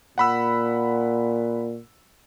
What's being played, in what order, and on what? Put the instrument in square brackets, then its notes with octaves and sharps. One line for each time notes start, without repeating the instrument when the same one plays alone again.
[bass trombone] A#2 [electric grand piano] F#5 B5 E6